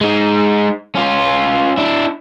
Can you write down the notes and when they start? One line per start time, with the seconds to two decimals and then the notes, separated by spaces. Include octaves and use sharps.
0.01 G#3 D#4
0.95 C#4 F4
1.77 D4 E4